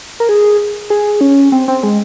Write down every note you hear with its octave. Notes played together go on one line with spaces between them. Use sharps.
A#4
G#4
G#4
C#4
C4
C4
G#3